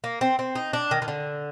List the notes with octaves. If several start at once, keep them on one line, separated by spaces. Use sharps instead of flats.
A#3
C4
C4
D#4
D4
D#3
D#3
D3